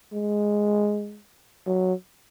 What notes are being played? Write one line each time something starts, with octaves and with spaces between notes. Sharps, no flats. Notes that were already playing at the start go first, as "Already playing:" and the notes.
G#3
F#3